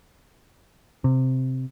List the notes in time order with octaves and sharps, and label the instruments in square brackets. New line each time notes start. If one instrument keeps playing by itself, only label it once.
[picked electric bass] C3